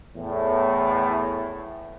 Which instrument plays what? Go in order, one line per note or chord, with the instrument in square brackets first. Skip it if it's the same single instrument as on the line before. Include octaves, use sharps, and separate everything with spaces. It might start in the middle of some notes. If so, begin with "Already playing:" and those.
[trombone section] E2 A2